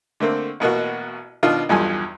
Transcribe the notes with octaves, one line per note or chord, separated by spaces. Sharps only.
D3 A3 A#3 C4
A1 B2 A#3 F#4
B2 D#3 D4 F4
B1 E2 G2 F3 A4 G#5